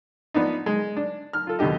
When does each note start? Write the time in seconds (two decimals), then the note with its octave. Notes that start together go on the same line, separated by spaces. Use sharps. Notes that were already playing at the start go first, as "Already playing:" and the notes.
0.34 F3 B3 D4 D#4
0.66 G#3
0.96 D4
1.33 F6
1.47 F4 A4
1.59 D#2 B2 D3 G4 D#5